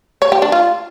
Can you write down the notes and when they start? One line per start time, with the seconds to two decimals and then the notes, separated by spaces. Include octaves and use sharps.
0.22 C#5
0.32 G4
0.42 D4
0.52 F4